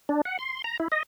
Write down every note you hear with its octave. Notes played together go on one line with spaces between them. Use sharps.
D4
F#5
C6
A#5
E4
D#5